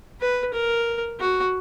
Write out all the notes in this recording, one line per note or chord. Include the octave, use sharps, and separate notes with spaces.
B4
A#4
F#4